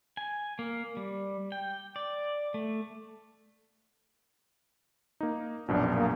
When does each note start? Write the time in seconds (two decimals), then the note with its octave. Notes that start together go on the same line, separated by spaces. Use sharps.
0.17 G#5
0.59 A#3
0.97 G3
1.52 G5
1.96 D5
2.54 A3
5.21 A#3 D#4
5.69 A#1 F#2 B2 D4
5.94 A#3